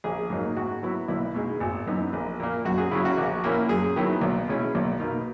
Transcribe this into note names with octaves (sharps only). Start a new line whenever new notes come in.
A#1 G#4
G#2 F#3 A#3 D#4
G#2 F#4
F#3 B3 E4
B1 E4
B2 G#3 D#4
G#1
F#2 E3 B3 D#4
A#1
A#2 A#3
F#2 F#4
G#4
C#3 F#3 C#4 E4
F#4
A#1
A#2 A#3 C#4 E4
F#2 G#4
D#3 F#3 B3 E4
B1
B2 G#3 C#4 E4
B1
B2 A#3 D#4